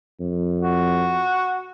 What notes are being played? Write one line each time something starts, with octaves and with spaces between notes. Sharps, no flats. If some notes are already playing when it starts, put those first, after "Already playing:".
F2
F#4